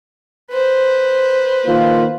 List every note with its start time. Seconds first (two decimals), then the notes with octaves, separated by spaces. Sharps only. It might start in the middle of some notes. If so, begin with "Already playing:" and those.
0.51 B4 C5
1.67 D#3 A#3 F4